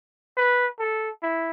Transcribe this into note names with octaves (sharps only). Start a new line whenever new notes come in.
B4
A4
E4